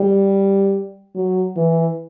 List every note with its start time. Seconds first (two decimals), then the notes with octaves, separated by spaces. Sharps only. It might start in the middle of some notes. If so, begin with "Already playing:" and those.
Already playing: G3
1.15 F#3
1.57 E3